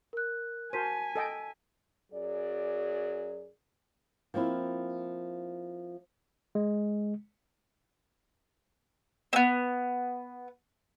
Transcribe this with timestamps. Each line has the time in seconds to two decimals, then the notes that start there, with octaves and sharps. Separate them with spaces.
0.13 A#4 F#6
0.73 F#4 A#4 C5 G#5 A5 B6 D#7
1.15 A4 D#5 G5
2.13 F#2 F#3 G#4 D5
4.34 F3 A#3 C4 E4
6.55 G#3
9.33 B3 C4